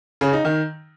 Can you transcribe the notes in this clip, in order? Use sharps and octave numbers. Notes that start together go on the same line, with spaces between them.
C#3
D#4
D#3